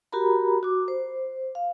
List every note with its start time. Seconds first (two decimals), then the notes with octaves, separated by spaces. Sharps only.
0.12 F#4 G4 A#4 A#5 B5
0.63 F#4 D6
0.88 C5
1.55 F5